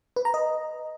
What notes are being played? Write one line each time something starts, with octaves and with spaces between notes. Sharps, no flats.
B4
A#5
D#5